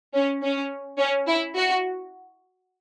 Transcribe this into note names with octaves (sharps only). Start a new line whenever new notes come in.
C#4
C#4
C#4
E4
F#4